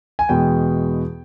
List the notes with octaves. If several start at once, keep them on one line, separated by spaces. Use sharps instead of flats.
G#5
E2 B2 G#3 G5